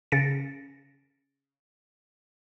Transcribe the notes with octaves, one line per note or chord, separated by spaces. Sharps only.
C#3 C#4 A6 A#6 C#7 D7